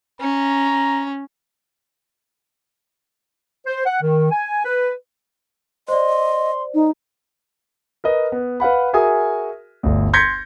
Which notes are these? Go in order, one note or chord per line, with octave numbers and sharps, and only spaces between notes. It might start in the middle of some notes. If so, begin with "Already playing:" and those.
C#4 A#5
C5
F#5
D#3
G#5
B4
C5 D5 D#5 C6
D#4
A#4 B4 D#5
B3
B4 F5 F#5 B5
F#4 G#4 A#4 E5 G#5 D#6
G1 D2
C6 G6 G#6 A#6 B6 C#7